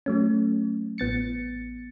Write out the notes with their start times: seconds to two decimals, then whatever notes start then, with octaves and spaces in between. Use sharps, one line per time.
0.06 F#3 A3 C#4
0.98 A1 B3 A6 C#7